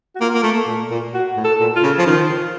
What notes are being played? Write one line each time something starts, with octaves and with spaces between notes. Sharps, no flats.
F#4
A#3 F4
A#3
A3
A#2
A#2
F#4
A2
A4
A#2
F4
C#3
F3
D#3 F4